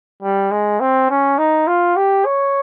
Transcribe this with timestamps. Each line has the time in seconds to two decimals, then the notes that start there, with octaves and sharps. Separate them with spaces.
0.22 G3
0.51 G#3
0.80 C4
1.10 C#4
1.38 D#4
1.67 F4
1.96 G4
2.26 C#5